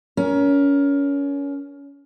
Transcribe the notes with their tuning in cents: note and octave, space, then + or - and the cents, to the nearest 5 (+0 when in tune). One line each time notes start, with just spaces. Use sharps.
C#4 +25 A#4 +20